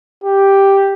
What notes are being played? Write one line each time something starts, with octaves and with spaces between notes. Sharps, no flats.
G4